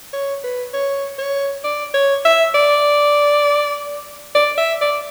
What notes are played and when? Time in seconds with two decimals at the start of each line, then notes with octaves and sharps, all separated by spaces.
0.13 C#5
0.44 B4
0.74 C#5
1.19 C#5
1.64 D5
1.94 C#5
2.25 E5
2.55 D5
4.35 D5
4.58 E5
4.81 D5